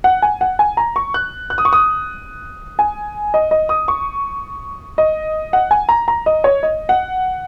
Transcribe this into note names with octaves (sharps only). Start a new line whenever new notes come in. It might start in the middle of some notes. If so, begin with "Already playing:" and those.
F#5
G#5
F#5
G#5
A#5
C#6
F#6
F#6
D#6
C#6
D#6
G#5
D#5
D#5
D#6
C#6
D#5
F#5
G#5
A#5
A#5
D#5
C#5
D#5
F#5